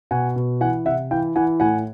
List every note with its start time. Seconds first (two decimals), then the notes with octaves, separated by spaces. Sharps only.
0.11 B2 F#5 G#5
0.36 B2
0.61 E3 F#5 G#5
0.85 C3 E5 F#5
1.11 E3 F5 G5
1.36 E3 F#5 G#5
1.60 A2 F#5 G#5